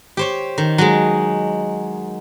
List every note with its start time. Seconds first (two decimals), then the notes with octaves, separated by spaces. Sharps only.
0.17 G4 C5 C#5
0.58 D#3
0.78 F#3 G#3